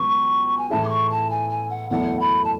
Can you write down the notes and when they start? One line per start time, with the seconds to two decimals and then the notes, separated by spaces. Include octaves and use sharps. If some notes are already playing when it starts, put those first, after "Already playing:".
Already playing: C#2 B2 F#3 B3 C#6
0.58 G#5
0.70 A2 E3 A3 E4 G#4 A5
0.85 D6
0.89 C#6
1.10 A5
1.30 G#5
1.50 G#5
1.70 F#5
1.90 F#1 E2 B2 A3 E4 F#5
2.20 B5
2.44 A5